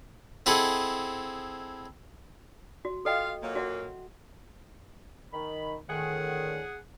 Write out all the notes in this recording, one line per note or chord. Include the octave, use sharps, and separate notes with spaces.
C4 E4 G#4 A4 D#5 F#5
F#4
F4 A4 D#5 F5 G5
A#2 F#3 A#3
F#4 E5 F#5
D#3 B5
A2 D3 D#3 G#4 F#5